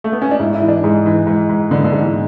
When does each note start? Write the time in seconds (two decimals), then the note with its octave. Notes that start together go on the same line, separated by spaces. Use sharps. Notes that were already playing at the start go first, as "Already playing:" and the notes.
0.04 A3
0.13 B3
0.22 C#4
0.31 D4
0.39 G#2 E4
0.55 E4
0.62 E3
0.68 D4
0.83 G#2 G#3
1.06 E3
1.27 G#2
1.49 G#2
1.71 D3 B3
1.84 D3
1.92 G#2
2.00 E3